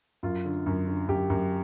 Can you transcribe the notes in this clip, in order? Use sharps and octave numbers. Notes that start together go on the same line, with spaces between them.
F#2 F4
D3
F#2
D3
F#2 G4
F#2